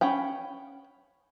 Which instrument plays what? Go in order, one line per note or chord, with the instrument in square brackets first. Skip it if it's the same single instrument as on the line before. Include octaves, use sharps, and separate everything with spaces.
[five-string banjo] C#4 F#5 G5 B5